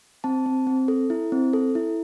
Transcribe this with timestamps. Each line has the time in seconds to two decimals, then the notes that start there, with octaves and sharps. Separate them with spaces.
0.24 C4 A5
0.46 C4
0.67 C4
0.88 A4
1.10 E4
1.32 C4
1.53 A4
1.75 E4